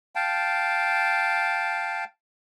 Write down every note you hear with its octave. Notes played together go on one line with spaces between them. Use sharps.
F5 G5 A5